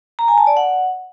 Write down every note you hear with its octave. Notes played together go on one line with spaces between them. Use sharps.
A#5
G#5
A5
D5
F#5